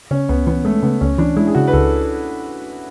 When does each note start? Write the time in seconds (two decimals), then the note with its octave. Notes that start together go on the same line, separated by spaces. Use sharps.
0.11 C#3 C#4
0.29 C#2 B3
0.47 E3 B3
0.65 G#3 A3
0.82 C#3 B3
1.01 C#2 C#4
1.18 E3 D4
1.37 G#3 E4
1.47 G#4
1.55 C#3 F#4
1.67 B4
1.73 C#2 A4